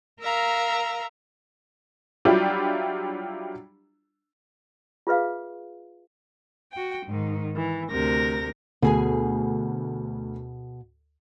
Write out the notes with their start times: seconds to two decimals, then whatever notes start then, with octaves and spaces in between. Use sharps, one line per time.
0.20 A#4 E5 F5 A#5
2.25 F#3 G3 D4 E4 F4 G4
5.07 F4 G#4 B4 E5 F5
6.71 F#4 G5
7.05 G#2 D#3
7.56 E3
7.91 D2 C3 A#4 A#6
8.82 D2 B2 G#4 G#5